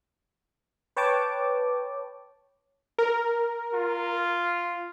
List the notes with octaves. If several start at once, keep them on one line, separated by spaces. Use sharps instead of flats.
B4 C#5 G5 A5 D6
A#4
F4